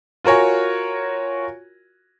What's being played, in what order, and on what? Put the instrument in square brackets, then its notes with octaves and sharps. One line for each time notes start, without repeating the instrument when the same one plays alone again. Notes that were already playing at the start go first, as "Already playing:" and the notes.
[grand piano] F4 F#4 A#4 C#5 G#5